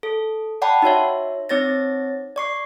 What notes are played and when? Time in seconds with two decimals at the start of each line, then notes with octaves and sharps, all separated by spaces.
0.03 A4
0.62 D5 F#5 G5 A5 B5
0.82 D#4 F#4 C#5 E5
1.49 C4 D#4 C#5 A6 A#6
2.36 D5 C#6 C7